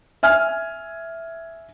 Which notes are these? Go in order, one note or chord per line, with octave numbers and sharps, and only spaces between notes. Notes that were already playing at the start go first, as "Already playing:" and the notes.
E5 G#5 F6